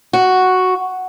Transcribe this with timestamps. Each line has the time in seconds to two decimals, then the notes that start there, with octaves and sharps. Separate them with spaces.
0.13 F#4